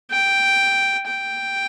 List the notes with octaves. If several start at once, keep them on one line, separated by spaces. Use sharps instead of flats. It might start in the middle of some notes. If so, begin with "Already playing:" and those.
G5
G5